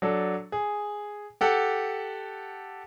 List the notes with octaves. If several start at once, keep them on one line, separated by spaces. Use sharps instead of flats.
F#3 D4 A4
G#4
G4 A4 F#5